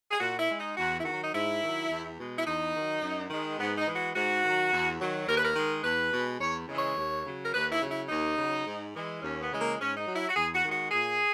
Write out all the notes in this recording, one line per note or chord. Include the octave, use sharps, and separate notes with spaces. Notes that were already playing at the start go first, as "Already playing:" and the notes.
G#4
A#2 F#4
E4
G#3
D#4
E2 F#4
E4
D#3 F#3 F#4
D#4
G#2 E4
D#3 F#3
E2
B2 G#3
E4
E2 D#4
D#3 F#3
F#2
D#3 G#3
G#2 B3
D#4
E3 G#3
F#4
G#2 F#4
D#3 F#3
E2
D#3 F#3
D#2 A#4
B4
A#4
D#3 G#3
E2 B4
B2 G#3
E2 C#5
C#3 E3 G#3
C#5
D#2
C#3 F#3
A#4
D#2 B4
E4
C#3 F#3
E4
D#2 D#4
C#3 F#3
G#2
E3 G#3
D#2 C#4
B3
C#3 E3 G#3
A#3
G#2 C#4
D#4
F#3
E4
F#4
E2 G#4
F#4
D#3 G#3
F#4
A#2 G#4